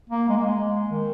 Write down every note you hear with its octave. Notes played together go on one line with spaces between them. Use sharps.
A#3
G#3
A#3
G#3
D#3